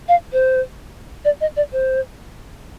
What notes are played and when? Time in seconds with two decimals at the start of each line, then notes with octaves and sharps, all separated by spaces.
0.08 F5
0.32 C5
1.25 D5
1.41 D#5
1.56 D5
1.72 C5